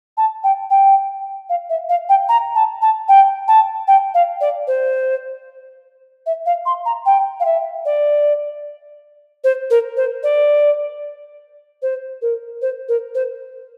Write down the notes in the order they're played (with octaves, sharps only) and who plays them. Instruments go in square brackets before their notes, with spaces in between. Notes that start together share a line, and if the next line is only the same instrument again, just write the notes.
[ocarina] A5
G5
G5
F5
E5
F5
G5
A#5
A5
A5
G5
A5
G5
F5
D5
C5
E5
F5
C6
A#5
G5
F5
E5
D5
C5
A#4
C5
D5
C5
A#4
C5
A#4
C5